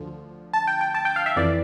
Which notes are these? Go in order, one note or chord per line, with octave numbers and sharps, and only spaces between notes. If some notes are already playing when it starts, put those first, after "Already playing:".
Already playing: D2 D3 F3
A5
G5
G5
A5
G5
F5
E5
F2 E3 D5